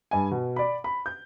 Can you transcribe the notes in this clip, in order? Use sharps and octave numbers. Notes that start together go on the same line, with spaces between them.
G2 G#5
B2
D5 B5
B5
G6